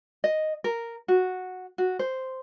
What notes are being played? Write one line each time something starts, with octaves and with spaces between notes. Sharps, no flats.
D#5
A#4
F#4
F#4
C5